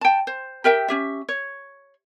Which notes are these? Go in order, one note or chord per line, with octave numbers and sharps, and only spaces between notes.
G5 A5
C5
G4 A#4 E5 G5
C#4 G4 E5
C#5